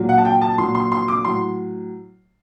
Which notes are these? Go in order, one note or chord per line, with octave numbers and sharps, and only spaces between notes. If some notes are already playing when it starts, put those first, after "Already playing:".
Already playing: A#2 F#3
F#5
A5
G5
A5
A#2 F#3 C6
C6
C6
D6
A2 F#3 C6